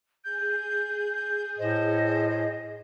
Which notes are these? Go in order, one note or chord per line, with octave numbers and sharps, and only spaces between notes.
G#4 G6
A2 C5 D#5